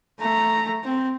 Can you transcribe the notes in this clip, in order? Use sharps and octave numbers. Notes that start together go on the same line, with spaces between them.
A3 A#5
C4